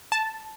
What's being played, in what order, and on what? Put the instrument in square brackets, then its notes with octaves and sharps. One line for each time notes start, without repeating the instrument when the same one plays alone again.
[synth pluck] A5